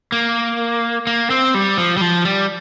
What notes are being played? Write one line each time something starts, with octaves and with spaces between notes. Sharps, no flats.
A#3
A#3
C4
G3
F3
G3
F3
G3